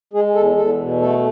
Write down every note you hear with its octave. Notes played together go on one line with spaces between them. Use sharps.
G#3 G#4
E2 A4
E2 A4
B2
A3 A4